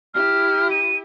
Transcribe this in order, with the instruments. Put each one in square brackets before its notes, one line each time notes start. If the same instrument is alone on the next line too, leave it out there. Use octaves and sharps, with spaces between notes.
[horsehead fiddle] E4 G4 [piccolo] F6
[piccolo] D#7